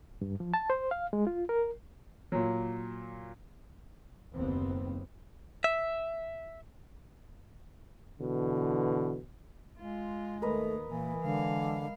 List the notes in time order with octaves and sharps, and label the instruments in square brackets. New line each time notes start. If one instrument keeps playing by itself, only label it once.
[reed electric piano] G2
F3
A5
C5
F5
G#3
F4
A#4
[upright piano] A#2 F#3
[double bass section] F#1 D#2 B3 C4
[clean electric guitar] E5
[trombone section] B2 D3 E3
[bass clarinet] G#3 [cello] F4
[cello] D#2 [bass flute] A3 [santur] A#4 B4 D#5
[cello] A#2 [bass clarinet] E3 [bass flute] A#3
[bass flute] D3 [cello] G#3 F5